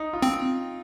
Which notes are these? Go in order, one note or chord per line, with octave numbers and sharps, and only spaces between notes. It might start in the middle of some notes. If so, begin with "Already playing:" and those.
Already playing: D#4
F4
C4